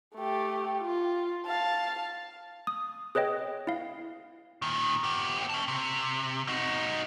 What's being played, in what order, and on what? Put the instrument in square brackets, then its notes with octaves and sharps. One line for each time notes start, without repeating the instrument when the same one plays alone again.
[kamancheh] A3 G4
F4
F5 A5
[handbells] D#6
G#4 B4 C#5 D#5 G5
E4 F5
[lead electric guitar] A#2 D#3
B3 G4
C#4 A5
C3
D#4 F#4